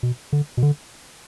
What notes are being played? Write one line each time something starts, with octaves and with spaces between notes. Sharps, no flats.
B2
D3
B2
D3